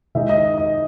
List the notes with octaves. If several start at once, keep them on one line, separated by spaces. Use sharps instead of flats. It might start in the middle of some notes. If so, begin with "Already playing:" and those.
D#3 G#3 D#4 E5
D#5
D#5